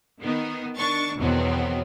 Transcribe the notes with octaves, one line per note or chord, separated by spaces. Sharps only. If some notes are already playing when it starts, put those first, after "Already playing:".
D#3 B3 D#4
D#3 D4 C#6 A6
E2 B2 D#3 F#3 B3 C4